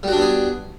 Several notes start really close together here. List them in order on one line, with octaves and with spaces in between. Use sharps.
G3 F#4 D4 B3 G#4